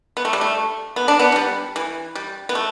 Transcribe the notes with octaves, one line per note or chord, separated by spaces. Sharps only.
B3
A3
G3
A3
B3
D4
B3
E3
G3
E3
G3
B3
A3